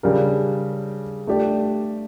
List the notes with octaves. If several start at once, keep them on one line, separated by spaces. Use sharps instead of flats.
C#3 G3 D4 G4 A#4
A3 D4 G4 D5